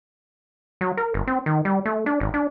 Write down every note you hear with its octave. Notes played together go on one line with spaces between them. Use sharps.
F#3
A#4
G1
C4
D#3
G3
A3
D4
G#1
D4